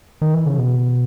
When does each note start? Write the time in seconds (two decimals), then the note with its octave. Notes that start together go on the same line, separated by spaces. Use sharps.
0.22 D#3
0.34 E3
0.46 C#3
0.58 B2